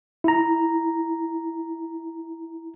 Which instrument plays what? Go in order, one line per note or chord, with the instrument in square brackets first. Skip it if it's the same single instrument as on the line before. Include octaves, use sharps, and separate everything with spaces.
[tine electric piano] E4 A#5